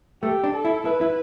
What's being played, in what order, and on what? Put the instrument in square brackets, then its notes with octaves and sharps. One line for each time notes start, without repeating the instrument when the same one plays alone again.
[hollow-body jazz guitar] A3 [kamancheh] G4
[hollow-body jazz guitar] D4
[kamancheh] A4
[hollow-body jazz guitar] E4
[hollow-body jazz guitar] E4 [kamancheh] B4
[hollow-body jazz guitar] E4